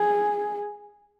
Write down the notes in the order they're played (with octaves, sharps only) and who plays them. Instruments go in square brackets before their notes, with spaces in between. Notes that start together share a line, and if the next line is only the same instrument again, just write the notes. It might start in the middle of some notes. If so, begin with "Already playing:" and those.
Already playing: [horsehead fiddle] G#4